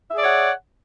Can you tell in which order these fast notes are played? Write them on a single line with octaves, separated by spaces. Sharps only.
E5 G#4 D5 C#5 F#5